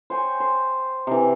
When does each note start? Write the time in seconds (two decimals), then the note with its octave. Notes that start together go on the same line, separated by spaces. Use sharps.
0.10 C5 C#5 G5 G#5
0.40 C5
1.07 C3 E3